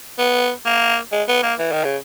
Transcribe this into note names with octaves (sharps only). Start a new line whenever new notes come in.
B3
A#3
G#3
B3
A#3
E3
D#3
C#3